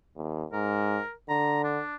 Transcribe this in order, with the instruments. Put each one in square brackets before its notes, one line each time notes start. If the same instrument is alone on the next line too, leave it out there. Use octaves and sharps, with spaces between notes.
[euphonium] D#2
[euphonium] G#2 [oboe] A#4
[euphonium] D3 [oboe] A#5
[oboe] D4